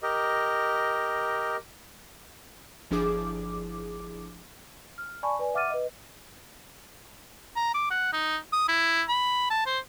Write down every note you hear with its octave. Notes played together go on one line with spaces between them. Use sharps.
G4 A#4 D#5
G1 F3 D4 E4 G#4 D6
F6
D5 G#5 A5 B5 C#6
B4 D5 G#5
E5 F#5 D6 F6 A6 D#7
B4 D#5
A#5
D6
F#5
D#4
D#6
E4
B5
A5
C5